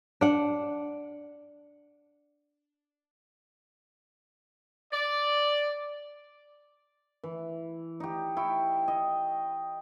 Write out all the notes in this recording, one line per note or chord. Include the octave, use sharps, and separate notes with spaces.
D4 F#5
D5
E3
D#4 G4
E4 G5 C#6
D#5